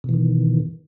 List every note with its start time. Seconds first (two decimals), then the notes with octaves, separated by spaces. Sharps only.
0.04 B2
0.09 E3
0.14 D#3